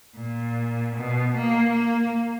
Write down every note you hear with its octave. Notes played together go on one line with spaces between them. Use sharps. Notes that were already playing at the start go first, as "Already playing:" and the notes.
A#2
B2
A#3
A#3